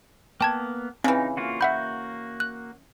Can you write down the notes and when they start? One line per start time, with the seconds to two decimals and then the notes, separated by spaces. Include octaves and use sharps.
0.41 A#3 B3 G5 A5 G#6
1.04 C#3 E3 C4 D#4
1.37 A#3 F4 F#4
1.61 A#3 F#4 E5 F#5 B5 G6
2.40 F#6